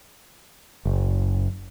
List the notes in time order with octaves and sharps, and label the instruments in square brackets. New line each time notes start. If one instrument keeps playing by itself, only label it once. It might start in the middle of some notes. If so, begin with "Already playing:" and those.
[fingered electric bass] F#1